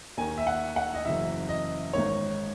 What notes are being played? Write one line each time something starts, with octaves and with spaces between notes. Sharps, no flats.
D#2 D#3 G#5
E5
F#5
F#5
D#5
F#1 F#2 E3 E5
D#5
G#1 G#2 D#3 C#5